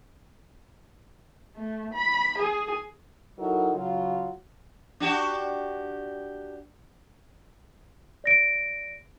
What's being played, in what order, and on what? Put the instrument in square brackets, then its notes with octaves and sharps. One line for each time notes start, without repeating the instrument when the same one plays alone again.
[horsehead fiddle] A3
B5
G#4
[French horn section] F#3 D#4 E4 F#4 A4 A#4
C#3 F#3 F4
[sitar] D4 F#4 G4
[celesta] D5 A#6 D7